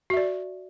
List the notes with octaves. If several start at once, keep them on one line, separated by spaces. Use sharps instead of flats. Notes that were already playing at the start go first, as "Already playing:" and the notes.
F#4 D5 E5